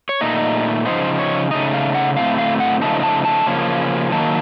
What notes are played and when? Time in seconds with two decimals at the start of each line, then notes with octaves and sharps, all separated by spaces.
0.09 C#5
0.21 A#2 A3 D#4 D#5
0.86 C#3 F3 C4 D#4 C5
1.19 C#5
1.51 C#3 A3 D#4 D#5
1.74 F5
1.95 F#5
2.16 A2 A3 C4 F5
2.38 F5
2.60 F#5
2.81 C#3 F3 A3 D#4 A5
3.03 A5
3.25 A5
3.46 C#3 F3 A#3 C#4
4.12 D#3 F#3 A#3 A5